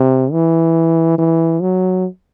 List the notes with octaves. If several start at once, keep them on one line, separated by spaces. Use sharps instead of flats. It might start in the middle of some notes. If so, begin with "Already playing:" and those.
Already playing: C3
E3
E3
F#3